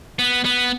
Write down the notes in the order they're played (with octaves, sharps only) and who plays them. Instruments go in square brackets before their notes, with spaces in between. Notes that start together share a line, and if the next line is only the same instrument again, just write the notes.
[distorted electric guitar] B3
B3